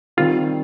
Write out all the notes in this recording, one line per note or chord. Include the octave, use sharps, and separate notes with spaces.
D#3 G3 C4 F4